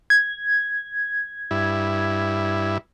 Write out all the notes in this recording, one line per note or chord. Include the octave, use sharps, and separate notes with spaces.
G#6
G2 E4